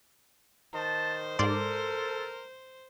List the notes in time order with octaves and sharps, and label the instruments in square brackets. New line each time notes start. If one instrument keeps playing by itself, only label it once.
[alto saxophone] D#3 [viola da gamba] C5 [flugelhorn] A5
[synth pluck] G#2 D5 C6 [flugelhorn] A4 [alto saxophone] A#4